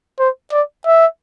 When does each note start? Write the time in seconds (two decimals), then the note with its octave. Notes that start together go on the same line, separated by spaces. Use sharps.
0.19 C5
0.52 D5
0.86 E5